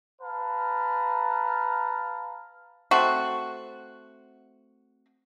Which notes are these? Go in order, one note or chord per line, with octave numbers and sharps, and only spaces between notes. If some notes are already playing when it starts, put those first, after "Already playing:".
B4 F5 A5 A#5
A3 C4 F#4